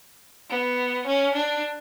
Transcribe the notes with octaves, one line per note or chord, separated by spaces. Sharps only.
B3
C#4
D4